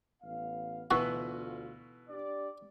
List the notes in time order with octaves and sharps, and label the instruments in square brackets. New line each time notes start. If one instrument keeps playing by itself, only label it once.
[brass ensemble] A1 B3 F5
[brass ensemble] D2 F4 [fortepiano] B2 E3 [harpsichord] F#4
[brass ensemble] D4 G4 D5